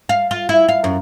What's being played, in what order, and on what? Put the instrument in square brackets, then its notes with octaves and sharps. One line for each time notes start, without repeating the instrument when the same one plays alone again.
[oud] F5
F4
E4
F5
F#2